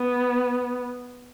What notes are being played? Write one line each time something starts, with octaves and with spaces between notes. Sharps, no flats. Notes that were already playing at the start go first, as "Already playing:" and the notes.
Already playing: B3